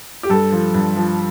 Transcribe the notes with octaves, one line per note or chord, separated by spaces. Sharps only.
G4
G2 A4
F3
G2
F3